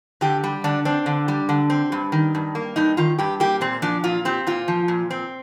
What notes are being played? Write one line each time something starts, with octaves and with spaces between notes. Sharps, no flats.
D3 G4
G3
D3 D4
C4 D4
D3
G3
D3
C4
G2
D#3
G2
A#3
G2 D#4
D#3 F4
G2 G4
A#3 G4
A#2 C4
F3 D4
A#2 F4
C4 G4
A#2 F4
F3
A#2
C4